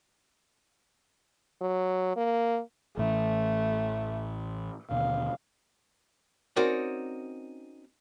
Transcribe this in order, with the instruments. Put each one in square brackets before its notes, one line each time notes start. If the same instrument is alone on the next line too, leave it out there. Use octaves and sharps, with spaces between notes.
[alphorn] F#3
A#3
[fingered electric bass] A1 A2 E3 [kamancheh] A3
[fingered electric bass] D#2 B2 D3 [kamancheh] F5
[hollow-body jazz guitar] C4 C#4 D#4 F#4 A#4 D5